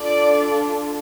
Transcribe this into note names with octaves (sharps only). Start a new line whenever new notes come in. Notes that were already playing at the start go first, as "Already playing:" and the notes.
Already playing: D4 F4 A4 D5